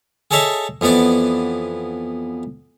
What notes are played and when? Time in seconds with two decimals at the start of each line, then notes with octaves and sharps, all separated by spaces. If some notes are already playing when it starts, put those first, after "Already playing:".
0.31 G#4 A4 C#5 D#5 E5 A5
0.81 F2 E3 B3 D5